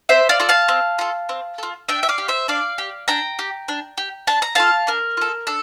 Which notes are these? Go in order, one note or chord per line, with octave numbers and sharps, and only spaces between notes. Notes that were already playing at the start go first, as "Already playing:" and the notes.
C4 C5 E5
D5 F5
F4 A4
F5 A5
C4
F4 A4
C4
F4 A4
D4 E5 G5
E5
D5 F5
G4
C5 E5
D4 D5 F5
G4
D4 G5 A#5
G4
D4
G4
D4 A5
A#5
F4 A4 F5 A5
D4 A#4
F4 A4
D4 A4